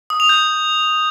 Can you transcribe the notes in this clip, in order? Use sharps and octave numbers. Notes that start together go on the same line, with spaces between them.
D#6
F7
G6